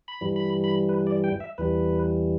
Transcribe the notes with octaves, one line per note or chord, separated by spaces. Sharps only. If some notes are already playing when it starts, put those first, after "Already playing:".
B5
G2 E3 G3
B5
B5
B4
D5
G5
E5
E2 E3 G3 B4